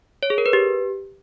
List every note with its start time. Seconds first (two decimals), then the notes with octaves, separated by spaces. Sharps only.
0.23 C#5
0.30 G#4
0.38 A#4
0.46 B4
0.53 G4